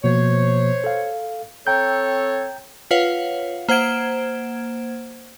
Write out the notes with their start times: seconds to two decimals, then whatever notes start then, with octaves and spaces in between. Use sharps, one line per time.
0.04 B2 F3 A#3 C5 C#5
0.84 A4 F5
1.67 C4 A4 C#5 G5 A#5 G6
2.91 F4 B4 C#5 F5 F#5
3.69 A#3 C5 F#5 G#6 D7 E7